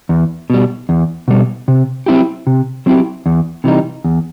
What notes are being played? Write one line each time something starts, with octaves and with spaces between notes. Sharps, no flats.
E2
B2 G3
E2
B2 G3
C3
F#3 C4 E4 G4
C3
F#3 C4 E4 G4
E2
C3 E3 G3 D#4
E2